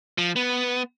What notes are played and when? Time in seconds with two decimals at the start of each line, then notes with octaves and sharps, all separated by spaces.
0.18 F3
0.36 B3